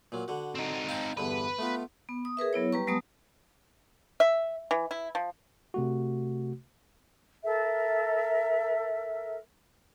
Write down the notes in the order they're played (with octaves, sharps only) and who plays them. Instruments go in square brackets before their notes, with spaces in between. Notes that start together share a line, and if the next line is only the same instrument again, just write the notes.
[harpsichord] A#2 F#3
D3 F#4
[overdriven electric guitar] C4 D#4
[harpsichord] F5 G5 A5
[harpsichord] E2 G2 D3 [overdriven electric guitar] B4
[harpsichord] A3 B3 F4
[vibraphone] B3
D#6
G#4 A#4 B4 E5
F#3 B3 E4 C#5
G3 G4 B4 A#5 C#6
F#3 G#3 A3 B3 A5 D#6
[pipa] E5
E3
E4
F3
[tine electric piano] C3 A3 F#4
[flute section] A4 A#4 E5